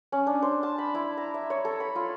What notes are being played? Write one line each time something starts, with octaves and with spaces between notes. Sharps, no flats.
C#4
D4
C5
A5
B5
E4
A#5
E5
C#5
A4
B5
F4